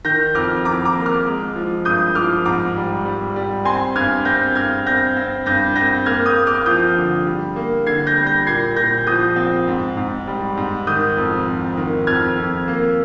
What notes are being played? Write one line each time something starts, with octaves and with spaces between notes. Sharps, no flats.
D#3 G6 A#6
F2 D6 F6
F2 A#5 D6
A#5 D6
A#3
D6 F6
G#3
F3
G2 D#6 G6
F3 D6 F6
G#2 A#5 D6
G3
G3
G3
C4 G#5 C6
G2 F6 G#6
C4 G6 A#6
G2 F6 G#6
C4 G6 A#6
C4
G2 G6 A#6
C4 G6 A#6
A#3 F6 G#6
D#6 G6
A#3
D6 F6
F3 D#6 G6
D3
G3
A#3
D3 G#6 C7
G6 A#6
G3
G6 A#6
A#2 G#6 C7
A#2 G6 A#6
F3 D#6 G6
C4
G#2
G#2
G3
G#2
D#3 D#6 G6
F2
F2
D#3
F2 F6 G#6
F2
A#3